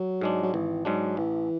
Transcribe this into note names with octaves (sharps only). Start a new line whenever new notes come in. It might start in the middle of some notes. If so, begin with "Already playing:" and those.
Already playing: F#3
G#2 G#3 D4
F#3
G#1 E3
G#2 F#3 G#3 D4
A1 E3